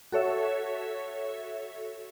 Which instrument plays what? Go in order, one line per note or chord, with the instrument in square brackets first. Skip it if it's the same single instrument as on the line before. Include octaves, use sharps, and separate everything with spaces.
[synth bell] F#4 A4 C#5 E5